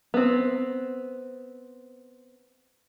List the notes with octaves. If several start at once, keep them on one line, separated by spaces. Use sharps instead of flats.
B3 C4